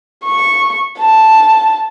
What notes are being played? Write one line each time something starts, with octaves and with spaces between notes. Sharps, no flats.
C#6
A5